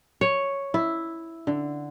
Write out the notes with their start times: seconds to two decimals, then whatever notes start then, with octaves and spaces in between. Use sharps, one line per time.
0.21 C#5
0.74 E4
1.47 D3